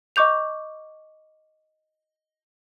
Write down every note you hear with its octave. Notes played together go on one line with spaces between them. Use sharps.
D#5 C#6 D6 G6 F7